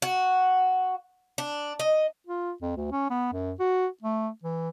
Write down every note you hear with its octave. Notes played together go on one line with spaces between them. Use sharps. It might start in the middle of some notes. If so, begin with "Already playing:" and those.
F#4
D4
D#5
F4
F2
D2
C#4
B3
F#2
F#4
A3
E3